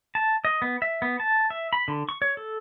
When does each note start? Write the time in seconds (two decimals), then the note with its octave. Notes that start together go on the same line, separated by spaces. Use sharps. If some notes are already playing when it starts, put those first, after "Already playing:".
0.15 A5
0.45 D#5
0.62 B3
0.82 E5
1.02 B3
1.20 A5
1.50 E5
1.73 B5
1.88 D3
2.09 C#6
2.22 C#5
2.37 A4